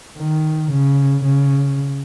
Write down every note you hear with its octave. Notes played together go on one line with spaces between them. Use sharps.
D#3
C#3
C#3